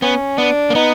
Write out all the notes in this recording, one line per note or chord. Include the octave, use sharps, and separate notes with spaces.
B3 C#4
B3 D4
A#3
B3 D#4